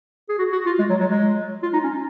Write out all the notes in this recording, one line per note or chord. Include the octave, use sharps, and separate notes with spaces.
G#4
F#4
F#4
F4
G#3
F#3
F#3
G#3
F4
D#4
C#4